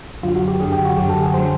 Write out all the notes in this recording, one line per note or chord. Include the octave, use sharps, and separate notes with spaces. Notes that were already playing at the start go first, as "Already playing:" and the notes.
F#2 D3 F#3 F4
F#4
G4
F#2 D3 F#3 G#4
G4
F#4
F#2 D3 F#3 G4
A4
G#4
D3 F#3 C5